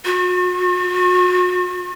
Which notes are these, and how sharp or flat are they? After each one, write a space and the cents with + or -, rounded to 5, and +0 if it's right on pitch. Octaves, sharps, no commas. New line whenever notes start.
F#4 -40